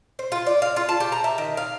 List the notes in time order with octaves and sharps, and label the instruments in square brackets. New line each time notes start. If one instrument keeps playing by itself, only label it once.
[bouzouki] C5
F4
D5
F5
F4
A5
G4
A#5
E5
D#3
F5